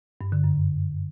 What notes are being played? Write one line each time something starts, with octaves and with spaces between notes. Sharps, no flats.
G2
D3
F#2